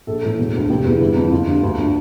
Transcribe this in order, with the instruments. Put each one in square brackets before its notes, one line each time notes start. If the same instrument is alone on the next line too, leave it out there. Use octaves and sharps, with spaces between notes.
[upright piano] A#1 A4
A2 E3
E1
D2 D3
F1 G4
E2 E3
G1
F2 E3
G1 F4
G2 D3
D2
D3